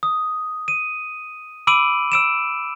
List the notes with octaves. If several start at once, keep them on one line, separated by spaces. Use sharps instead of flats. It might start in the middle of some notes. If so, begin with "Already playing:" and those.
D#6
D#7
B5 D6 E6 D7 D#7 F#7
E6 D7 E7